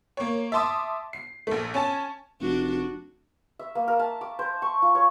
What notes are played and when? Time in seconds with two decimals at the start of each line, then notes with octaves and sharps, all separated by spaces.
0.17 A#3 C#5
0.52 E5 A5 C6 D6 D#6
1.13 C7
1.47 A#1 A3
1.74 C#4 G#5 A5
2.41 F1 D4 F#4
3.59 E5
3.75 A#3
3.88 A#4
3.99 A5
4.21 D6
4.39 C5
4.62 C#6
4.82 F4
4.95 C#5